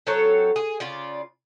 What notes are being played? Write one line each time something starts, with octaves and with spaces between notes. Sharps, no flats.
F#3 C4 A4 C#5
G#4
C#3 F4 D5